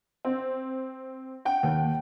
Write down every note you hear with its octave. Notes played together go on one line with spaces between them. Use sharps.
C4
F#5 G5
D#2